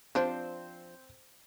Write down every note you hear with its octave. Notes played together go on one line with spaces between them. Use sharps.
F3 C4 D4 C5